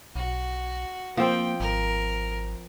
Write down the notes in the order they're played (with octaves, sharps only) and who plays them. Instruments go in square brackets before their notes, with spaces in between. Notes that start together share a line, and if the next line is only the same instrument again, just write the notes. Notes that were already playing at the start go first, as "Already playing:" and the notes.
[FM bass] B1 [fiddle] F#4
[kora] F3 C4 [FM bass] A#3 [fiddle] G5
[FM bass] G#1 [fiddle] A#4